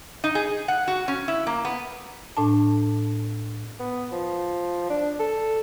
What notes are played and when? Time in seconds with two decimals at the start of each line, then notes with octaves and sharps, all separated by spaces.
0.24 D#4
0.35 G#4
0.68 F#5
0.88 F#4
1.08 C#4
1.28 E4
1.47 A#3
1.65 B3
2.37 A2 D4 A5
3.80 B3
4.12 F3
4.90 D4
5.20 A4